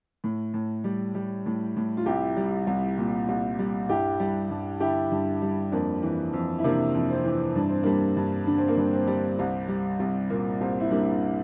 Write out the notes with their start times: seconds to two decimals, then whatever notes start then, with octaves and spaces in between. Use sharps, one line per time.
0.24 A2
0.54 A2
0.84 G3
1.15 G3
1.46 A2
1.77 A2
1.97 F4
2.06 C2 E4 G4
2.37 G3
2.67 C2
2.98 A#2
3.29 C2
3.59 G3
3.89 G2 E4 G4
4.20 G3
4.50 G2
4.80 D3 E4 G4
5.12 G2
5.42 G3
5.72 F2 A#3 D4
6.03 E3
6.33 F2
6.59 E4
6.64 C3 A#3 D4
6.94 F2
7.10 C4
7.25 E3
7.55 G2 D4
7.69 C4
7.83 G3 A#3 D4
8.17 G2
8.47 D3 D4
8.58 C4
8.68 A#3
8.77 G2 C4
8.93 C4
9.07 G3
9.39 C2
9.68 G3
10.00 C2
10.30 A#2 A#3
10.61 C2 C4
10.80 E4
10.90 G3 A#3 D4